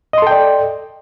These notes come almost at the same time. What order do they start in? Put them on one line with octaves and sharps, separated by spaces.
D#5 C6 A4 G5 D5